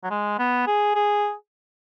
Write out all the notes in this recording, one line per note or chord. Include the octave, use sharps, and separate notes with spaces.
F#3
G#3
B3
G#4
G#4